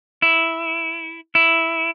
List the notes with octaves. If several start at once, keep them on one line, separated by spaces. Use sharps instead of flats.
E4
E4